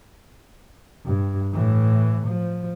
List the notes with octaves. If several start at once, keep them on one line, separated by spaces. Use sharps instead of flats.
G2
A2 E3
F3